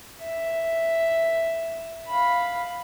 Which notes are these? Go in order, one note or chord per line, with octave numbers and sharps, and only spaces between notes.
E5
F5 B5